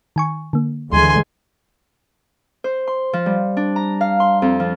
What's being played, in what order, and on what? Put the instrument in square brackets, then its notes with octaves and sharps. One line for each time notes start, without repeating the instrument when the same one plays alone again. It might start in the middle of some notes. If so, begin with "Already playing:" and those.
[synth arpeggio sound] D#3 G#5 C#6
D3 A#3
[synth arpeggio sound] D2 [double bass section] D3 E3 G#3 [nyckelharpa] G#5 C6
[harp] C5
C6
F3
G3
D4
A#5
F5
C6
F2
F3